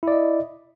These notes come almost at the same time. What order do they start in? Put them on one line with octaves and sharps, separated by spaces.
E4 D5 D#5